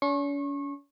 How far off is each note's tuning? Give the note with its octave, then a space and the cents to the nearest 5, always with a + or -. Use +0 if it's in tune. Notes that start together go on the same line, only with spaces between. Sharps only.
C#4 +40 C#6 -30